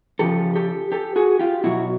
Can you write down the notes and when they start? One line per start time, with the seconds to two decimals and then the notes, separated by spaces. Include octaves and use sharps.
0.19 C#3 F3 G4 A4
0.56 G4 A4
0.92 G4 A4
1.16 F#4 G#4
1.39 F4 G4
1.64 B2 F#3 E4 F#4